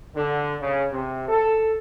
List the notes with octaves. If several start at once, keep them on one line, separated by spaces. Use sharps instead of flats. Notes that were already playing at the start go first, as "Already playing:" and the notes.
D3
C#3
C3
A4